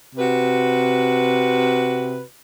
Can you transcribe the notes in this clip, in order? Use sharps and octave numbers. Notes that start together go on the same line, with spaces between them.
C3 F#4 B4